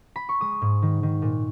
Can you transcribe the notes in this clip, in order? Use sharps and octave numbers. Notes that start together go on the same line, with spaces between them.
B5
C#6
G#3 D#6
G#2
D#3
D#3
A#2